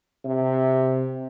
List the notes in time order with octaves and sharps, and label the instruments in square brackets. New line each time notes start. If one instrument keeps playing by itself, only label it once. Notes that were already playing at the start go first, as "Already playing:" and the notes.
[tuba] C3